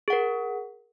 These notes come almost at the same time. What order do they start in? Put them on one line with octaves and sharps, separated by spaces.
G#4 F#5 A#4